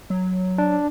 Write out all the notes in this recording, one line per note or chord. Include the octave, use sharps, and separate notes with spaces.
F#3
D4